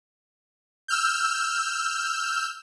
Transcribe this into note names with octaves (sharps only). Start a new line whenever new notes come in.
E6 F6 G6